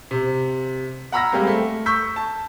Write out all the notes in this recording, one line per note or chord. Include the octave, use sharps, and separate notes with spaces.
C3
F#5 A#5 B5 E6 F6 A#6
G3 G#3 A#3 C4 G4
A3
C#6 E6 G6 B6
A5